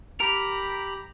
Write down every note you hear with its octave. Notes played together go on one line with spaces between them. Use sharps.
G4 A#4 A#5 B5